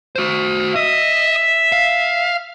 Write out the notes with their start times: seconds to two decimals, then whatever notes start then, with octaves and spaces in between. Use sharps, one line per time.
0.16 F#4 C5
0.76 D#5 E5
1.72 F5